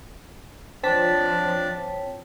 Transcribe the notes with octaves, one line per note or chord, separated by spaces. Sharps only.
F3 C4 D4 C#5 G5 A5 B6